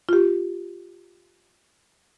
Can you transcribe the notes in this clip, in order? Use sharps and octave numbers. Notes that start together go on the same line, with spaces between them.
F4 G4